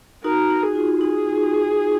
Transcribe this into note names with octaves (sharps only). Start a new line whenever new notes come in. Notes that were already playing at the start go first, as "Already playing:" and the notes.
D#4 F#4 A#4
D#4
G#4
F4
D#4 G#4